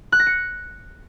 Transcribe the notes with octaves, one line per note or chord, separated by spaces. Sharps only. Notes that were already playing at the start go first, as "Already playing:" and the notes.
F#6
A#6
C#7